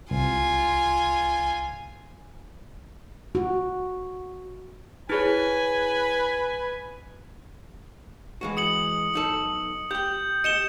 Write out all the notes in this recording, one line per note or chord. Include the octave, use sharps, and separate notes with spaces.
C2 F4 G#5
F#4
E4 G#4 B4 C#5 G#5
E3 G#3 F#4
D#6 C#7 F#7
B1 D#4 A4
G4 G5 G6
G4 D#5 C#7 E7 G7